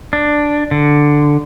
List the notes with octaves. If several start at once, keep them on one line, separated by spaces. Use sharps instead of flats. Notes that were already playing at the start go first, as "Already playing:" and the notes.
D4
D3